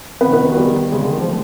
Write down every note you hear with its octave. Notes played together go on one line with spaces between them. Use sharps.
D#3 B3 B4
B3 B4
F#4
G3 G4
C#3 G#3 G#4
D3
D#3
F3
A3